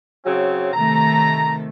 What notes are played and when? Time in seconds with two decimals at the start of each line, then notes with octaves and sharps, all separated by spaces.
0.24 C#3 F#3 C4
0.73 C3 D#3 A3 A#5